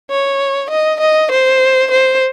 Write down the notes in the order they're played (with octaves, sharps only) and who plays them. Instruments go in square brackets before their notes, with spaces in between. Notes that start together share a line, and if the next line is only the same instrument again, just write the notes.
[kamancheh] C#5
D#5
D#5
C5
C5